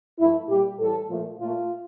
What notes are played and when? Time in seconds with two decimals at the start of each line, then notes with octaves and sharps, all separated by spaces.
0.19 G2 F3 A3 E4
0.49 A#2 G3 G4
0.79 A2 E3 G3 A4
1.10 A#2 F3 A3
1.39 A#2 A3 F4